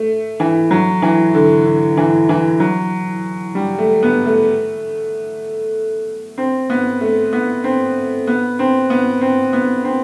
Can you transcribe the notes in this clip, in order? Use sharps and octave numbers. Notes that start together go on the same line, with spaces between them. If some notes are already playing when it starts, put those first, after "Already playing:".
Already playing: A3
E3
F#3
E3
D3
D3
E3
E3
F#3
G3
A3
B3
A3
C4
B3
A3
B3
C4
B3
C4
B3
C4
B3
C4